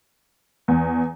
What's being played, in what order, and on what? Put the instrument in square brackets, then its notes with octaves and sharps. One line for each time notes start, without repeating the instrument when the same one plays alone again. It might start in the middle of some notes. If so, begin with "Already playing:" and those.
[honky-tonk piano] E2